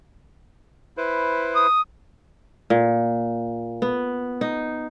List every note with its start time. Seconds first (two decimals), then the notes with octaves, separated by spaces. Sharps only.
0.97 E4 B4 C5
1.56 D#6
2.70 A#2
3.82 B3
4.41 D#4